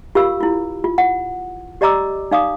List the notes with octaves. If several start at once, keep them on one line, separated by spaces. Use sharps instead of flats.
F4 G4 A#4 F5 B5 E6
E4 F4
F4
F#5
G4 D5 D#5 A#5 D6 E6
D#4 D5 F5 D6 D#6